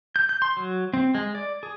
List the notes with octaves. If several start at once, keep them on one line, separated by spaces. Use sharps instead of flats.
G6
G6
C6
F#3
C4
G#3
D5
G#4